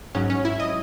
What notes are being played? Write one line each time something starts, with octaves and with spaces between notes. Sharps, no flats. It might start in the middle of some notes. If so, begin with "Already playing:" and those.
G#2 F#3 C#4
C#4
E4
D#5